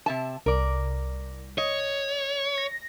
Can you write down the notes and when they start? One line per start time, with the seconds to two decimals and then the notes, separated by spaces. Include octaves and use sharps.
0.06 C3 E5 A5
0.46 C2 A#4 D5
1.58 C#5 D#5
2.58 A#6